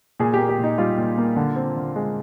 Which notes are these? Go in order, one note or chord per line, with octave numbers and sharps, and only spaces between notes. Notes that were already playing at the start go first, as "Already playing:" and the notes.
A#2 G#4
A#3 G4
G4
A#2
D#4
G3 F4
A#2
A#3
D3
C4
D3
G#3